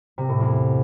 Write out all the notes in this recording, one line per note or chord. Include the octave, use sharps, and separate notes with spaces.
C3
A2
E2